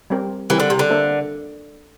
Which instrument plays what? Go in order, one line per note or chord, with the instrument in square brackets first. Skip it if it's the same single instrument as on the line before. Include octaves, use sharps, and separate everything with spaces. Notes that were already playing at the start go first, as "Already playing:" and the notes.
[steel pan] G3 C4 G4 A#4
[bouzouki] E3 [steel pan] G3 C4 G4 A#4
[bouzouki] D3
C3
D3
[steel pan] A#3 D4 A4 C5 E5